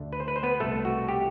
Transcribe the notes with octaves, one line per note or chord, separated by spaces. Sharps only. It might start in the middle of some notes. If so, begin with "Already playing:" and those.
Already playing: D2 D3 A3 D4
B4
C5
B4
C5
B3 B4
C2 B2 A3 A4
F#4
G4